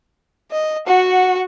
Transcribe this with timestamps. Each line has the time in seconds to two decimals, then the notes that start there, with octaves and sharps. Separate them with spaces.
0.51 D#5
0.87 F#4 F#5